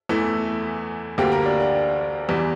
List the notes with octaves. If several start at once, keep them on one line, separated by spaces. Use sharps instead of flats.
E2 E3 A3 E4
D2 D3 G3 A#3 G4
A#4
D4
D4
E2 E3 G3